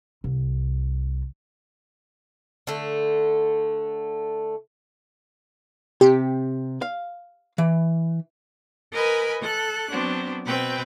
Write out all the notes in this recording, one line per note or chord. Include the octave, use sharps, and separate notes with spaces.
C2
D3 A3
C3 G4
F5
E3
A#4 B4 D#5 G#5 B5
A4 F#6
F#3 B3 C4 D4
B2 C4 B4 G5